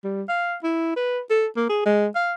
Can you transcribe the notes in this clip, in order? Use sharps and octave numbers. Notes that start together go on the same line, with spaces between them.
G3
F5
E4
B4
A4
A#3
G#4
G#3
F5